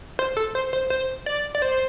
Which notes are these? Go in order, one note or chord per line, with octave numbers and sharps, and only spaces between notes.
C5
A4
C5
C5
C5
D5
D5
C5